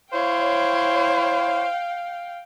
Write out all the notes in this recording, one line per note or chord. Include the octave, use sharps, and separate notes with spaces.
E4 C5 C#5 F5 G5